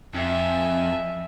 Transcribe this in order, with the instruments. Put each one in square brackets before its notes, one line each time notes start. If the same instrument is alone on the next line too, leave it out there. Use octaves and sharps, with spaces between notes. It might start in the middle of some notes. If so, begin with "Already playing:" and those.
[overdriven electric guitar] F2 [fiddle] E5 G#5